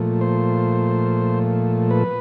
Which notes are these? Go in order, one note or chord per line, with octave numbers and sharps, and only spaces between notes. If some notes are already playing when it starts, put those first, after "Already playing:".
Already playing: A#2 F3 A3
C5
B4